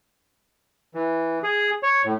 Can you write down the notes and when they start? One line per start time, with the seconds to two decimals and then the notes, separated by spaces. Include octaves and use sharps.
0.94 E3
1.43 G#4
1.83 C#5
2.05 A2